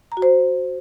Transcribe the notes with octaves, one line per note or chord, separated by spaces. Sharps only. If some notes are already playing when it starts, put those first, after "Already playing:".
A#5
F#4
C5